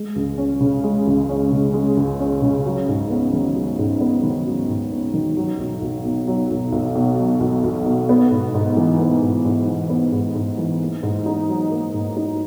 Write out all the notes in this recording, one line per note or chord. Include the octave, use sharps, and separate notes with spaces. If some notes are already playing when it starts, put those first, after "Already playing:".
Already playing: G#3
C#2
C#4
C#3
G#3
C#2
C#4
C#3
G#3
C#2
C#4
C#3
F#3
G#2
B3
D#3
F#3
G#2
B3
D#3
F#3
G#2
B3
D#3
F#3
B1
B1
B2
F#3
B1
B1
B2
F#3
B1
B1
B2
B3
G#2
G#2
E3
B3
G#2
G#2
E3
B3
G#2
G#2
E3
A#3
G#2
D#4
F#3
A#3
G#2
D#4